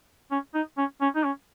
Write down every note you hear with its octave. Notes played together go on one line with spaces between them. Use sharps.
C#4
D#4
C#4
C#4
D#4
C#4